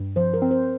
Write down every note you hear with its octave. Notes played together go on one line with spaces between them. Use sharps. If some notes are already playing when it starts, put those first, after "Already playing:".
Already playing: G2
F3 C5
A#4
C4
C5